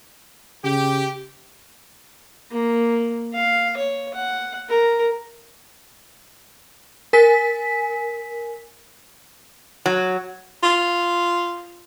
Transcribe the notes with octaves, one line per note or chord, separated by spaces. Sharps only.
C#3 G4
A#3
F5
C#5
F#5
A#4
A#4 G#5 B6
F#3
F4